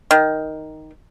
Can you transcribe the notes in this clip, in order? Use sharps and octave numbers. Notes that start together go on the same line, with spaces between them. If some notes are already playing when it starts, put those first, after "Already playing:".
D#3